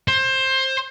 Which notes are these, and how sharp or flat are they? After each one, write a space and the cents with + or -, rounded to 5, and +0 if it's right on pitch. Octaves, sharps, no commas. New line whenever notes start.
C5 +20